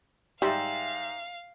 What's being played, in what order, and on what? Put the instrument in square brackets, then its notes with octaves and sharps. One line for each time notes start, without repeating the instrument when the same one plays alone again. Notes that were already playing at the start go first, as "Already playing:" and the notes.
[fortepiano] G#2 E5 C6 [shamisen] G3 [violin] F5